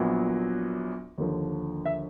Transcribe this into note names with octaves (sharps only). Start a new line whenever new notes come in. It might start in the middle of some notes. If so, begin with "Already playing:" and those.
Already playing: A#1 A#2 F#3 B3
D#2 D3 F3
E5